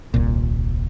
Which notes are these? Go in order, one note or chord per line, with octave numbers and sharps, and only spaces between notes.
D#1 C2 A#2